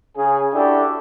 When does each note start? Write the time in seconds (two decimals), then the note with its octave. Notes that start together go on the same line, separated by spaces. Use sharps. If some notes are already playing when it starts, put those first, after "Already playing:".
0.17 C#3 G#4
0.53 D4 E4 F#4 G4 A4